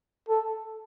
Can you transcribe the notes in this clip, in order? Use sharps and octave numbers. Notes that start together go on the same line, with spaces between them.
A4